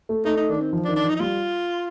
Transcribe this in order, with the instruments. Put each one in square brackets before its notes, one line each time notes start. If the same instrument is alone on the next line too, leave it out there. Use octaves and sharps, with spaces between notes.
[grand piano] A3
[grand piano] A3 [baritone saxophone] D#4
[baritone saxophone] D#4
[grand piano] D#3 [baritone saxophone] D4
[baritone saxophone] C4
[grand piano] F3
[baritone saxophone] D4
[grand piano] D#3
[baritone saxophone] D4
[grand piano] F3 [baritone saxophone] D#4
[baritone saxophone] D#4
[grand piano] G3 [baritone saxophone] F4